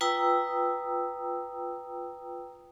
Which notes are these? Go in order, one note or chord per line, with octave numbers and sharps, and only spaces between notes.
F4 B4 G5 A#5 D#6 E6